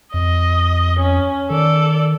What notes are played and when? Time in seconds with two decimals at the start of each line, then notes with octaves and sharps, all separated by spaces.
0.14 F2 D#5
1.00 C#4
1.50 D#3 A4 D5